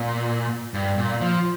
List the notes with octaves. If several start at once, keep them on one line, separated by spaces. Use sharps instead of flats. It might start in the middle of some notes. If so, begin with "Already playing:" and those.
Already playing: A#2
G2
A#2
F3